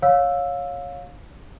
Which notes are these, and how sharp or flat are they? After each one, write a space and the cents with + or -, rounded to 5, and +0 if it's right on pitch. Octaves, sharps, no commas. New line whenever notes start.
C#5 +0 F5 +20 E6 +0